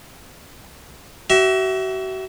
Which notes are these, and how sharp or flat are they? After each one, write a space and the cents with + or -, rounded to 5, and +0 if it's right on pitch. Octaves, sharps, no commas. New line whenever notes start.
F#4 +40 E5 +0